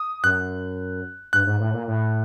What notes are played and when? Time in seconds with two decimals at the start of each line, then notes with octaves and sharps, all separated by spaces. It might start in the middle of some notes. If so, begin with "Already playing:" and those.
Already playing: D#6
0.24 F#2 F#6
1.33 G2 F#6
1.46 G#2
1.60 A2
1.74 A#2
1.87 A2